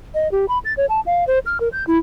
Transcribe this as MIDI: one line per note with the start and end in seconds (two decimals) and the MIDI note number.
0.14 0.31 75
0.32 0.46 67
0.48 0.58 83
0.65 0.73 93
0.77 0.86 73
0.89 1.00 81
1.06 1.24 77
1.27 1.39 72
1.46 1.58 89
1.60 1.69 70
1.72 1.86 91
1.87 1.98 64